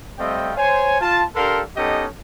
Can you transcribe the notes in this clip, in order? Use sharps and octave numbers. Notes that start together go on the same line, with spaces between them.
G3 A3 C4 D#5 F5 G5
C5 C#5 G#5
F4 A5
D4 G4 A4 A#4 F5 C6
B3 C#4 D#4 G4 A4 D#5